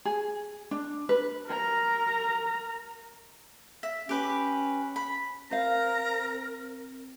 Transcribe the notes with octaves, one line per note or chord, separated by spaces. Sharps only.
G#4
D4
B4
A#4 A#5
E5
C#4 G4 B4 D6
B5
C4 A#4 C5 F5 A#5